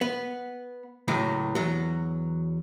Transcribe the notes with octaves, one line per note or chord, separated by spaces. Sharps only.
B3
C#2 A2 F#3
E2 F#3